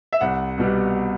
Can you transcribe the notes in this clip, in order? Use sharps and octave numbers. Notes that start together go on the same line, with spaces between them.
E5
C2 F#5
B2 G3 B3